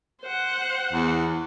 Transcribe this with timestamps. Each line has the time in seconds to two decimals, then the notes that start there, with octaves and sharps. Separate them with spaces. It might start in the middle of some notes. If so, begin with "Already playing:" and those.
0.22 C5 F#5
0.93 E2